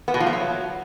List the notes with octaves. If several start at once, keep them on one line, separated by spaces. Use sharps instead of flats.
B3
B2
F3
A3
F#3